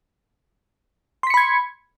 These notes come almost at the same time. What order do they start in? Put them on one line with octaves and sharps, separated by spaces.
C6 B6 C#7 B5 G#6